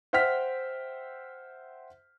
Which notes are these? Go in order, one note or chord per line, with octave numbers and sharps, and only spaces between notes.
C5 E5 F#5 G5 F6 B6